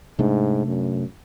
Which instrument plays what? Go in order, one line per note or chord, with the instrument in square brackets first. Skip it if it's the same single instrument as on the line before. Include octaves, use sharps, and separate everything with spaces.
[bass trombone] G#2 [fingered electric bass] C3 A3 D4
[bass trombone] F#2